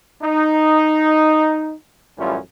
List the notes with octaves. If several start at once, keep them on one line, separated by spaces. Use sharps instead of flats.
D#4
A1 F#2 G3 C#4 E4 F4